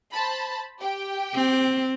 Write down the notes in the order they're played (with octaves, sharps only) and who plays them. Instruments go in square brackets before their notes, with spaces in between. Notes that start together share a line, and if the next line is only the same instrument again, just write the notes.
[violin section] C5 A5 B5
G4 G5
[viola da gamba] C4